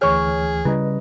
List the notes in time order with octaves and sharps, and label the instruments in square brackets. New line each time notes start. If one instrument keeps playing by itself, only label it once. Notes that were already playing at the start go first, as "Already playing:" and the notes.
[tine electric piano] D2 E3 F6 [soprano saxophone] G#4 [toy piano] C#5 C#6
[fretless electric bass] C#3 G3 [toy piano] E4 [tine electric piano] B4 D#5